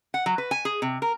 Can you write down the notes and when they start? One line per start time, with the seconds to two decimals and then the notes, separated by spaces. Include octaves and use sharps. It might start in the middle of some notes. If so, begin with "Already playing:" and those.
0.14 F#5
0.26 F#3
0.38 B4
0.51 G#5
0.65 G#4
0.82 C3
1.02 A#4